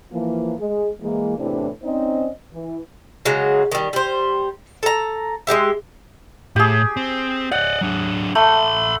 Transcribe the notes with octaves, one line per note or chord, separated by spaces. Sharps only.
E3 F3 A#3
G#3
E3 G#3 A#3
E2 A2 C3 E3 D4
C4 C#4 D#4 C5 D5 D#5
E3
C#3 F#3 G#3
D#3 G3
G3 C5
A4 A#5
G#3 A#3 G4 E5
A2 G4 G#4
C4
D5 D#5 F#5
F#3 D4
A3 B5 C6